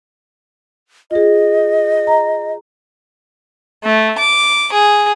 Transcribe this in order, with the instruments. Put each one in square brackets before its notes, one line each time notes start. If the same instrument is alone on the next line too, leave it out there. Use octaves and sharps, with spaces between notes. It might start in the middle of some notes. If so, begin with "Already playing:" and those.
[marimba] F4 G#4 [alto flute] D#5
[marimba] A#5
[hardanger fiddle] A3
D6
G#4